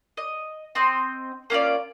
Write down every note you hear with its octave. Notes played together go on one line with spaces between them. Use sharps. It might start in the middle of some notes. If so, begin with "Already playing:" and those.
D#5
C4 D#5 G5 C6
A#3 C#4 F4 D5